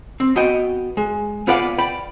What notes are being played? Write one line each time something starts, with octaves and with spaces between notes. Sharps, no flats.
C4
B3 F#4 D#5 G5
G#3
B3 F4 B4 D5 F5 F#5
D5 G5 B5